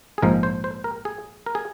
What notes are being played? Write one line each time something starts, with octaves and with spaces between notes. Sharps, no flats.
G#4
A#1 G#2 F3 G#3 A#4
C5
C5
A#4
G#4
A#4
G#4